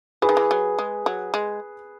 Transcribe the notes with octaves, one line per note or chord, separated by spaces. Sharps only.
E3 G#4 B4
D#3
E3
F#3
G#3
F#3
G#3